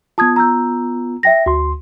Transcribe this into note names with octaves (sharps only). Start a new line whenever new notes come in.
B3 F4 A5 D#6 G#6
A#5 E6 G6
E5 G5 A#6
D2 F#4 C6